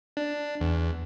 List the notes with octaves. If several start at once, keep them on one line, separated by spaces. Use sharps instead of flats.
D4
E2